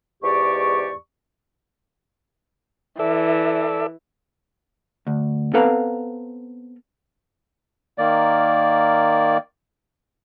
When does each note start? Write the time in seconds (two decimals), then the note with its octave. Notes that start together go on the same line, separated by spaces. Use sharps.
0.23 E2 G#2 G4 D5 C#6
2.99 E3 A4 D5 E5
5.07 D2
5.54 B3 C4 A4 B4 F5 A#5
7.98 D#3 A#3 D5